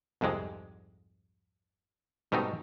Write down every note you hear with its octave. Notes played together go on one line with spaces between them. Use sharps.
C2 F2 G#2 C3 G#3
G#2 B2 G3 A3 C4 D#4